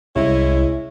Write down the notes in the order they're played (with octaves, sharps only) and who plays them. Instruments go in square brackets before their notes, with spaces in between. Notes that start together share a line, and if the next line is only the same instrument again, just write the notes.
[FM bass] C2 [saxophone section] G#3 C#4 E4